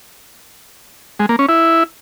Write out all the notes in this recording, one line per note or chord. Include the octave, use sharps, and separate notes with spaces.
G#3
A#3
C#4
E4